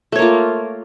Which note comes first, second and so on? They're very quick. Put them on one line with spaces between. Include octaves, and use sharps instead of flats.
A3 C#5 A#3 F4